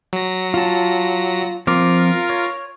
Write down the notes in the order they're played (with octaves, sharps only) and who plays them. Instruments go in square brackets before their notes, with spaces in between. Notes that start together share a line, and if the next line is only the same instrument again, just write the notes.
[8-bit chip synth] F#3 A#6
[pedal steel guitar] F4 A5
[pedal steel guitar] F3 C4 D6 [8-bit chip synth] F4 A#4
[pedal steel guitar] C#5